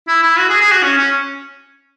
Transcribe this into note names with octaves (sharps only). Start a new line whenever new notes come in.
E4
E4
F#4
G#4
G#4
F#4
C#4
C#4